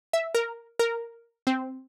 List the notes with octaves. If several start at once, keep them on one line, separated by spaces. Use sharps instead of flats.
E5
A#4
A#4
C4